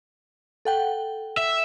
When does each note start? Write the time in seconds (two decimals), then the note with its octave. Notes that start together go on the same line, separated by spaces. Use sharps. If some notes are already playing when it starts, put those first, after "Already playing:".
0.65 A4 F#5 G5
1.37 E5